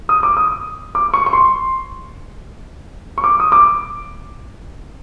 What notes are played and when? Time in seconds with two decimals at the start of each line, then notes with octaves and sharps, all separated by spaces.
0.09 D#6
0.23 D6
0.37 D#6
0.95 D6
1.14 C#6
1.26 C#6
1.33 C6
3.18 C#6
3.24 D6
3.40 D#6
3.52 D6